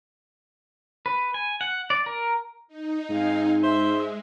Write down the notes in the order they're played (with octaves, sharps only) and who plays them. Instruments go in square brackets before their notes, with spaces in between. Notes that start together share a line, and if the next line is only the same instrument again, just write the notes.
[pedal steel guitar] B4
G#5
F#5
D5
A#4
[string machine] D#4
[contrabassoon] G#2 [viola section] C4 F5 G#5
[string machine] G#3 [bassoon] C5 [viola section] E5